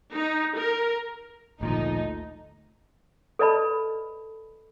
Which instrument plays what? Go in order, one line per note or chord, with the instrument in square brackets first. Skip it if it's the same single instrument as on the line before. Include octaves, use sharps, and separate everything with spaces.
[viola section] D#4
A#4
[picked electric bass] G#1 A#2 F3 [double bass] D2 A3 [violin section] D#4
[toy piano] A4 B4 D5 D#5 A5 B5